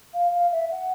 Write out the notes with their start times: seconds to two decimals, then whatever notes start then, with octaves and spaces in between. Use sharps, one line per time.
0.14 F5
0.33 F5
0.52 E5
0.71 F#5